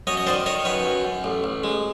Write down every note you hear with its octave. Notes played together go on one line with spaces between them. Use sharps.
F#2 C#5 D#5
D#5
D#3 C5 D5
D#3 C#5 D#5
F#2 B4 C#5
F#2
F#2
A1
A1
G#3